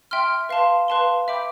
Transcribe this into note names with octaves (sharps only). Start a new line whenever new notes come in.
E5 G5 C6 F6
B4 F5 A5 C6
B4 F5 A5 C6
E5 G5 B5 D6 G6